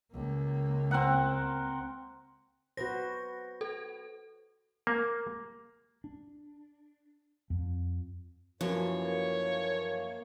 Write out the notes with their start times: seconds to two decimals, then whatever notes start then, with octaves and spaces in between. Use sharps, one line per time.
0.12 C#2 A#3
0.91 C4 A#4 F#5
2.77 F#4 B4 C5 A#6
3.61 A4
4.87 A#3
6.04 D4
7.50 F2
8.61 F#2 E3 F3 A#3 C#4 C#5